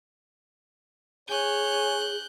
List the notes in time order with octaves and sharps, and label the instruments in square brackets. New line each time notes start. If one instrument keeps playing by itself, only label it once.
[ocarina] G#4 [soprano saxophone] C#5 [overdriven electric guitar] G#5 [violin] F#6 G6